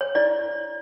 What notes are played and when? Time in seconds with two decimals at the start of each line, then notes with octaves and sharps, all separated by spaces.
0.01 C#5
0.15 E4 D5